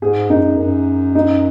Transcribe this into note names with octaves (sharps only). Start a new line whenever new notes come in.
G#2 G#4
F#2 D#4
F#2
D#4